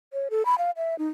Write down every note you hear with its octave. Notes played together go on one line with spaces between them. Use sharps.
C#5
A4
B5
F5
E5
D#4